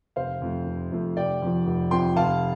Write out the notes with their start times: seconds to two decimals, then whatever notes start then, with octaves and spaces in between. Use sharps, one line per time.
0.16 F1 C5 F5
0.42 F2 F3 A3
0.66 F1
0.92 F2 F3 A3
1.16 F1 D5 G5
1.42 F2 F3
1.66 F1
1.91 F2 F3 G5 C6
2.16 F1 F5 A5